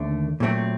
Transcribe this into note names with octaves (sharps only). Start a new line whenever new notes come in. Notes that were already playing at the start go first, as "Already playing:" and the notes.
Already playing: D#2 D3 A3 D4
A#2 F#3 A3 C4